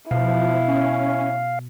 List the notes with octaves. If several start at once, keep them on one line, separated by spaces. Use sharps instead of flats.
B2 F3 E4 F5
C#4